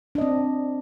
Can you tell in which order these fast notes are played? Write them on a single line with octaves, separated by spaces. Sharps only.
D4 D#5 C4